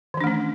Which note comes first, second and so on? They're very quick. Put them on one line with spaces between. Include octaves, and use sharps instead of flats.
D#3 E3 D4 A3 C#4